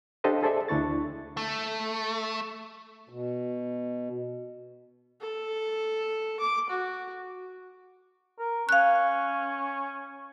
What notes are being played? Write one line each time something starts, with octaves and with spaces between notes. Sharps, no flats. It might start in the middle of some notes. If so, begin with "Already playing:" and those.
D4 G4 A4 C5 D#5 F5
G#4 A4 C5 D5 E5
D2 D4 E4 C#6 A6
A3
B2
A4
D6
F#4
A#4
C#4 F5 F#6